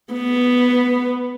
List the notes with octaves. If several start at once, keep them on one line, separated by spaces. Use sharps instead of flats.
B3